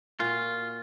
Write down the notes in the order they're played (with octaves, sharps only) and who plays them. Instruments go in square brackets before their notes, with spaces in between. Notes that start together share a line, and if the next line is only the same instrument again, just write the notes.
[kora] A#2 F#4 [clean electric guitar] F4